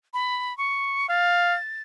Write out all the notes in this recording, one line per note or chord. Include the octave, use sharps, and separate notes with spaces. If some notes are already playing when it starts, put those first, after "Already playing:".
B5
C#6
F5 A6